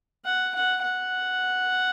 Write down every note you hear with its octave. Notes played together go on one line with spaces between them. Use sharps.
F#5
F#5
F#5